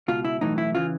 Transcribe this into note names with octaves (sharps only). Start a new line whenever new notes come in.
C#2 B2 F4
E4
B1 A2 E3 D#4
E4
C#3 E3 F4